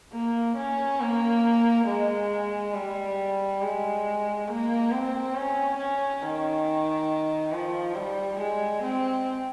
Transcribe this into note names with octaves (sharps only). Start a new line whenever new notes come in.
A#3
C#4
A#3
G#3
G3
G#3
A#3
C4
C#4
C#4
D#3
F3
G3
G#3
C4